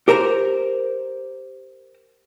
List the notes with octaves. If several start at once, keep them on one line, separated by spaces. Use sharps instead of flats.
G4 A#4 C5 A#5